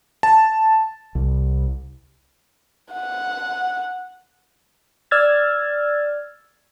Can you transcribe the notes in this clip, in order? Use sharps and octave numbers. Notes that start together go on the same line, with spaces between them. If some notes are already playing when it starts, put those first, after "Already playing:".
A5
C2
F#5
D5 E6 F6 G#6 A6